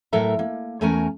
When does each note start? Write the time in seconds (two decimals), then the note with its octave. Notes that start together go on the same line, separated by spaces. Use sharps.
0.13 A2 F#3 A4 A#4 E5 A#5
0.39 A#3
0.81 E2 A3 C#4 A#4 G#5 A#5